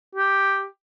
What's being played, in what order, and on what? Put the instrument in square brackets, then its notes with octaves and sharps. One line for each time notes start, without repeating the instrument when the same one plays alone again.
[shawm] G4